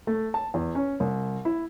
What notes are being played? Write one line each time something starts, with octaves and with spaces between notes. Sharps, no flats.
A3
A5
E2
C#4
C2
E4